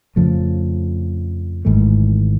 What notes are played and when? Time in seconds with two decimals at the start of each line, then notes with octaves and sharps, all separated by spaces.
0.16 F2 C#3 F3 A3
1.65 G#1 G#2 E3 A3